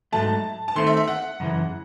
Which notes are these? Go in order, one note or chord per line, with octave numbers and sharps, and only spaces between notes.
G#2 F#3 A3 A5
A5
D#3 A3 C4 C6
E5
E5
F#5
F#2 C#3 E3